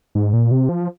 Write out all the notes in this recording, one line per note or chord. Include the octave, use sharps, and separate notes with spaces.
G#2
A#2
C3
F3